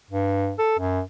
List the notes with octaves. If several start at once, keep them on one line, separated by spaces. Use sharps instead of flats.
G2
A4
F#2